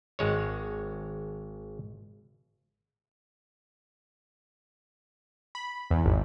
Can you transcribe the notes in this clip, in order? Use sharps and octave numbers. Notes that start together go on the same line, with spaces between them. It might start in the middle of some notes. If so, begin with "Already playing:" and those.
G#1 G#3 C#5
B5
E2
G#1